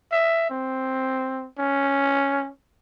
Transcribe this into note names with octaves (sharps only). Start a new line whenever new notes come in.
E5
C4
C#4